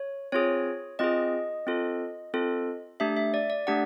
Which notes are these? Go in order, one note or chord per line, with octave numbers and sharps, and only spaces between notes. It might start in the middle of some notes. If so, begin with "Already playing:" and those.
Already playing: C#5
C4 F4 G#4 C#5
C4 F4 G#4 D#5
C4 F4 A4
C4 F4 A4
A3 D4 G4 E5
E5
D5
D5
A3 D4 G4 F#5